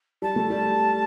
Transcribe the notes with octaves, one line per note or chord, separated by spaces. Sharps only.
G3 A5
A3
G3